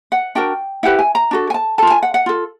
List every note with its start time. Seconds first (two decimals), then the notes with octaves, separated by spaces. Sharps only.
0.12 F#5
0.35 D4 F#4 A#4 G5
0.83 E4 G4 B4 F#5
0.99 G#5
1.15 A#5
1.31 D4 F#4 A4
1.50 G#5
1.54 A5
1.78 F4 A4 A5
1.90 G#5
2.03 F#5
2.14 F#5
2.26 F4 A4